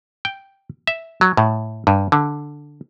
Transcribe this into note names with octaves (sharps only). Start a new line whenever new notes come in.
G5
E5
F#3
A2
G2
D3